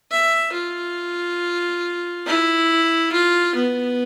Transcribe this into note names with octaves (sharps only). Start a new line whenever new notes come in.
E5
F4
E4
F4
B3